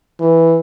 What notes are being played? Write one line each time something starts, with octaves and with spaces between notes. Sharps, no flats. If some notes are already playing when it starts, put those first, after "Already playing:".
E3